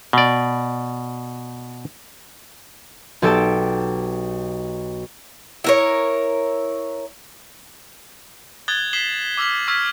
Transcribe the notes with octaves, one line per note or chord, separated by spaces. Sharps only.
B2 D5
B1 G4 A4 G5 A5 D7
E4 A#4 C#5
D#6 F#6 G#6 A6 F#7 G7
D#6 B6 C7 E7 F#7 G7
D6 E6 F6 B6 F#7
C#6 E6 F6 G#6 B6